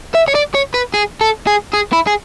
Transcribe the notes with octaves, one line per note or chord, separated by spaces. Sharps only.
E5
C#5
D5
C#5
B4
G#4
A4
G#4
G#4
E4
G#4